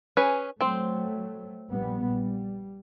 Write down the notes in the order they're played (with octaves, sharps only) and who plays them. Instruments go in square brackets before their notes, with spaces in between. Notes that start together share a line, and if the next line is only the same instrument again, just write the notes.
[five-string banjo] C#4 G#4 B4
[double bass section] F#3 A3 [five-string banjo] C4 C5
[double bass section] A#1 G3 B3
G3